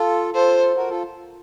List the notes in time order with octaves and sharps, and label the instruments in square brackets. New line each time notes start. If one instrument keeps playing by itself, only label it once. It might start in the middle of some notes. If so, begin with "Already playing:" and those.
Already playing: [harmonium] F4 A4
[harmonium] F4 A4 [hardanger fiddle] C5
[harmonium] F#4 A#4
F4 A4